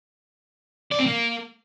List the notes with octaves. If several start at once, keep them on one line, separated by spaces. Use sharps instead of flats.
D5
C4
A#3